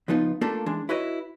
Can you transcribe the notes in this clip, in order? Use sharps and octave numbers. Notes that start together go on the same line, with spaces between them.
C#2 F3 B3 D#4 F4
A3 A#3 D4 F4 A4
E3 G#3 D4
E4 F#4 B4 C#5 D#5